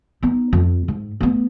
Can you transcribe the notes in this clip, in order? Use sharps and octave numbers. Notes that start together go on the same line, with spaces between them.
B3 D#4
F2
G#2
A3 B3